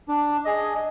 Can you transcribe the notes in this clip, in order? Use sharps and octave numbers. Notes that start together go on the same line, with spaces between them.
D4
G#4 D#5